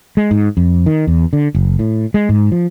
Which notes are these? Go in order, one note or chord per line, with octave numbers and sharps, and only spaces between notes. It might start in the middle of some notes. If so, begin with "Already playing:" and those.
G#3
G#2
F2
D#3
E2
D3
F#1
A2
G#3
G#2
F3